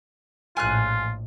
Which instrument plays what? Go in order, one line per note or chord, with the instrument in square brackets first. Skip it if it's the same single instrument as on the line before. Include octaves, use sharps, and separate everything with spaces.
[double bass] A#1 A2 [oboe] F4 [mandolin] G#5 F6 F#6